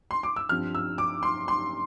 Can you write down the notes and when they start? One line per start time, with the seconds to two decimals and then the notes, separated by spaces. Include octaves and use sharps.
0.11 C6
0.23 D6
0.36 E6
0.49 G2 F3 C4 F6
0.75 E6
0.98 D6
1.23 C6
1.48 C6